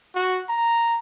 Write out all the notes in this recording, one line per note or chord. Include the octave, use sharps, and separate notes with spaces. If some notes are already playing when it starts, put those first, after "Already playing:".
F#4
A#5